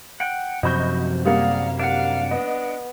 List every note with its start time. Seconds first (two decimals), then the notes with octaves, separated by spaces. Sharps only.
0.20 F#5 G5
0.63 F#2 C3 F3 F#4 D#5 B5 G6
1.26 G3 A#3 G#4 D5 F5 F#5
1.80 D4 F5 F#5
2.31 B3 D#5